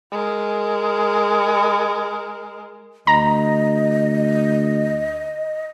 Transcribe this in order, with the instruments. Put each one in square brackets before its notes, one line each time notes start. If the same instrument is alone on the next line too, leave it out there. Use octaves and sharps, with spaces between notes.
[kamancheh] G#3 A#4
[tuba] D2 [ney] D#5 [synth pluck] A#5